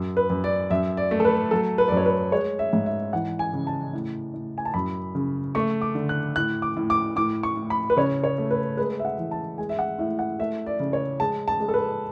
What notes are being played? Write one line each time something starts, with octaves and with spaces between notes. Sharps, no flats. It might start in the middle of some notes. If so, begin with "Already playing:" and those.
Already playing: F#2
B4
F#2
D5
F#2 E5
D5
A3
A4
B4
F#3 A4
B4
D5
F#2
C#5
B4
G#3 C#5
E5
G#2
E5
E3 F#5
G#5
C#3
A5
A2
A2
G#5
A5
F#2 B5
C#3
A3 C#6
D6
D3
F#6
A2 F#6
D6
A2
D6
A2 D6
C#6
A2
B5
B4
C#3 C#5
C#5
A3
B4
G#3 B4
E5
F#5
E3
A5
G#3 G#5
E5
F#5
A2 E5
F#5
A3 E5
D5
C#3
C#5
G#3 A5
A5
G#3
A4
B4